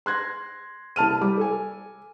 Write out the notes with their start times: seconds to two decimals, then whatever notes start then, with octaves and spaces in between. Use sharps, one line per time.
0.06 C6 F#6 G#6 A#6
0.96 C2 A5 F6 D#7
1.21 G3 D6
1.38 A4 G#5